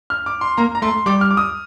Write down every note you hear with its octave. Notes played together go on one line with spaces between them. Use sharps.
F6
D6
C6
A#3 A#5
A#5
A3 C6
G3 D6
F6
D6
D#6